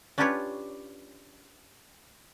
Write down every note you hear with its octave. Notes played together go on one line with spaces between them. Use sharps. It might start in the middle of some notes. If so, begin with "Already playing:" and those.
C#4 D4 F4 G4 B4 C#5